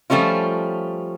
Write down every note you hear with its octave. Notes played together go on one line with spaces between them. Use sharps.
F3 G3 A3 C#4 F4